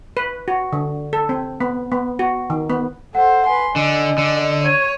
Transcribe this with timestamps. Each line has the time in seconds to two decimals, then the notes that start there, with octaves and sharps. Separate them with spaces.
0.17 B4
0.48 F#4
0.73 D3
1.13 A4
1.29 C4
1.60 B3
1.92 B3
2.19 F#4
2.50 D#3
2.70 B3
3.15 A4 C5 F#5
3.46 B4 G#5 C6
3.76 D3 D#5
4.18 D3
4.65 C#5 G#6 D#7